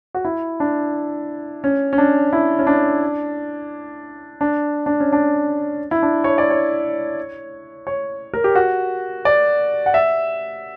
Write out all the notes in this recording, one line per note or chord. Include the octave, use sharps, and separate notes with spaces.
F#4
E4
D4
C#4
C#4
D4
E4
C#4
D4
D4
D4
C#4
D4
E4
D4
C#5
D5
C#5
C#5
A#4
G4
F#4
D5
F#5
E5